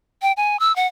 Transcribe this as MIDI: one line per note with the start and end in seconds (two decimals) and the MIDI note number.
0.22 0.32 79
0.37 0.59 80
0.60 0.74 88
0.76 0.87 78